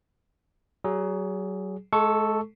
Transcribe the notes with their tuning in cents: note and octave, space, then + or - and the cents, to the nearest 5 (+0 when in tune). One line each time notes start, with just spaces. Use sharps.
F#3 +30 G#4 +0
G#3 +40 A4 +0 C#6 +0